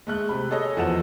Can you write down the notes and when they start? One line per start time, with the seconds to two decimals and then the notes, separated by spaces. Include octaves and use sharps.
0.07 G#3 A3 F#6
0.29 C3 B5
0.50 G#4 A4 C#5 D#5
0.77 E2 F3 F#4 A4 F#5 E7